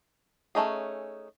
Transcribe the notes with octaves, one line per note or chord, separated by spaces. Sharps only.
A3 C#4 D#4 G#4